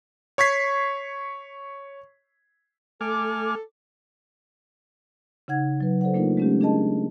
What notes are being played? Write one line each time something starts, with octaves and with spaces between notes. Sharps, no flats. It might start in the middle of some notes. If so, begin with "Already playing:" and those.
C#5 C#6 G#6 B6 C7
A3 A4 G#5 D6 F6
C#3 D#4 F#5 G#6
F#3 B4
A4 C5 D5 F#5
A3 A#3 D4 D#4 F4 A#4
G#3 A3 C#4 D4 G4
D4 D#4 G#4 A#4 D#5 A5